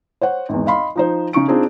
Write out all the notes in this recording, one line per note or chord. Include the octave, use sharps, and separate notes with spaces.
C5 C#5 F#5
G#1 E2
D#5 F5 B5 C6
F3 D#4 C5
C#3 D#4 C#6 D7
C4 D4 D#4 F4 G#4